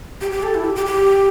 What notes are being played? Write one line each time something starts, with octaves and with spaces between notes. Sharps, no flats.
G4
G4
A4
E4
G4
G4
G4